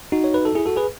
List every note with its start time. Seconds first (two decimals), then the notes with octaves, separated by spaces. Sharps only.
0.12 D#4 F#4
0.24 C#5
0.34 B4
0.45 A4
0.55 E4 G#4
0.66 F#4 A4
0.76 G#4 B4